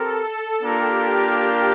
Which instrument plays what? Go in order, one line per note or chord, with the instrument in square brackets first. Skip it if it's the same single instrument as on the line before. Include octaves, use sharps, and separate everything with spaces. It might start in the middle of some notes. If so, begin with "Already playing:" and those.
Already playing: [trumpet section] C4 G4 A#4 [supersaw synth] A4
[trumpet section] A#3 D4 F4 A#4 [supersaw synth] G4